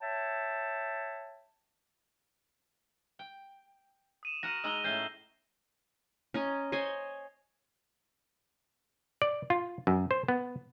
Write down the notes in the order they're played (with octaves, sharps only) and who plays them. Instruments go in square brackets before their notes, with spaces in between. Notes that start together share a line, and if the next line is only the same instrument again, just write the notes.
[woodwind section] C#5 E5 G5 A5
[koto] G5
[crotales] D#6 D#7 E7
[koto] F#4 A#4 F#5 [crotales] A#6 D#7
[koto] G#3 D#4 A#5 [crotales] E6 F#7 G7
[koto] A2 A3 C#4 [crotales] G6 C7 G7
[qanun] C#4 D#5 A#5
C5 C#5 D#5 G#5
[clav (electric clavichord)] D5
F4
F#2
C5
B3